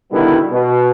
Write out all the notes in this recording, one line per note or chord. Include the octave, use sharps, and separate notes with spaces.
B2 D3 D#3 G3 B3 E4
B2